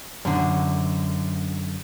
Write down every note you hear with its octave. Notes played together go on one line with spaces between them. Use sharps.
F#2 D3